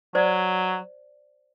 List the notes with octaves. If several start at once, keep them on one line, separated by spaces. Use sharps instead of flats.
F#3 C5 D5